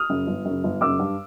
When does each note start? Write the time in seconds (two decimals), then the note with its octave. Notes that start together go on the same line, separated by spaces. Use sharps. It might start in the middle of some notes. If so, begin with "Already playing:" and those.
Already playing: D#6 F6
0.09 F#2 C#3
0.27 G1
0.45 F#2
0.50 C#3
0.64 G1
0.81 F#2 C#3 D6 E6
0.99 G2